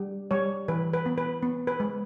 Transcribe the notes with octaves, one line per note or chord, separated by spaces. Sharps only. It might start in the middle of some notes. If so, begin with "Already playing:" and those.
Already playing: G3
G3 C#5
E3 B4
B4
B3
B4
B3
B4
G#3